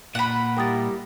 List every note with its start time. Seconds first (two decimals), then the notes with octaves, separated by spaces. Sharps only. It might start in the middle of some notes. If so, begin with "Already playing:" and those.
0.15 A#2 F#5 B5
0.57 G3 E4 A#4 G5 D#6 A6